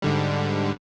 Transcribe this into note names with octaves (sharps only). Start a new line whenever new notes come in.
G#2 D3 G3